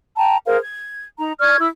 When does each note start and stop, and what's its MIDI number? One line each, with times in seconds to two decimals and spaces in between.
0.17 0.37 79
0.17 0.37 81
0.17 0.37 82
0.46 0.58 68
0.46 0.58 70
0.46 0.58 72
0.46 0.58 77
0.63 1.04 92
1.18 1.32 63
1.18 1.32 82
1.40 1.58 74
1.40 1.58 85
1.40 1.58 89
1.40 1.58 92
1.60 1.69 64
1.60 1.69 88